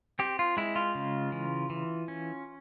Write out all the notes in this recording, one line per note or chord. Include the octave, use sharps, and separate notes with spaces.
C4 G4
F4
G#3 E4
F4
C#3
E3
E3
C#4